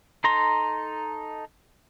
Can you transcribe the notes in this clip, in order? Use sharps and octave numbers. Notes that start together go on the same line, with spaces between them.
D#4 A4 A#5 C6